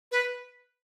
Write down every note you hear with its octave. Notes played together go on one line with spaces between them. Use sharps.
B4